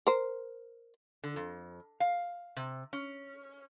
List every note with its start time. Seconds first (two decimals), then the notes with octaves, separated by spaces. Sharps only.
0.07 A#4 C5
1.24 D3
1.36 F2
2.00 F5
2.56 C3
2.93 C#4